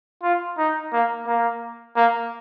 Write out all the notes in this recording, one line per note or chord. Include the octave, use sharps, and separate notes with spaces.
F4
D#4
A#3
A#3
A#3